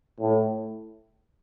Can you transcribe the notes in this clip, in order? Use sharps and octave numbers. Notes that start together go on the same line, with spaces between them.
A2